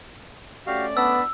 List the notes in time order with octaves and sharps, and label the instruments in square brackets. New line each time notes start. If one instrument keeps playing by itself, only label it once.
[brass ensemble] A3 C#4 D5 [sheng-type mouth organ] F#4 G4 F5
[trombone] B3 [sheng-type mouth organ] D4 A5 B5 [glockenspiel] E6